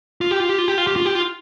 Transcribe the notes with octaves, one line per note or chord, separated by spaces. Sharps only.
F4
G4
F4
G4
F4
G4
F4
G4
F4
G4
F4